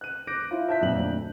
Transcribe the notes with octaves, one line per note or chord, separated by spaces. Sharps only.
F#6 D#7
D6 F#6 G6 A#6 D7
E4 F4
E5 A5 G6 B6
F2 A#2 F#3 D4 F#7
D2